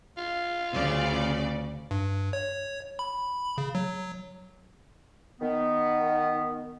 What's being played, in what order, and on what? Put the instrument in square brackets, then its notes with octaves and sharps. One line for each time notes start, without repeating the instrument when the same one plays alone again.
[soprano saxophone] F4
[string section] D2 C#3 D5
[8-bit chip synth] G2
C#5
B5
C#3
F#3
[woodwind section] D#3 B3